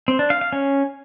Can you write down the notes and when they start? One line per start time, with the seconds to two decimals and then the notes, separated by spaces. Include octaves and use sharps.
0.08 C4
0.19 D4
0.30 F5
0.41 F5
0.53 C#4